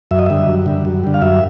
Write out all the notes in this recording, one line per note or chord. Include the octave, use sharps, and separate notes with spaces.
F#2 E5
D#5
D3 G3 E5
F#2
D3 G3
F#2
D3 G3
F5
F#2 E5